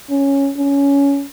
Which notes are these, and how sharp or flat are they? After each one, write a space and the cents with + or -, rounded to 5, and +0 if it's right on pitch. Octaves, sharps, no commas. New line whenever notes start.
C#4 +0
C#4 +15